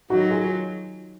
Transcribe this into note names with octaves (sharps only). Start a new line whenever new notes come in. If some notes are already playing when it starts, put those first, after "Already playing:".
D#3 F#3 D#4 F#4
F4 G#4